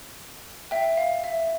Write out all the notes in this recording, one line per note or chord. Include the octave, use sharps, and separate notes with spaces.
E5 G5
F5
E5